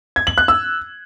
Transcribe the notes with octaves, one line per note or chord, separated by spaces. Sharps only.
G#6
F#7
F#6
E6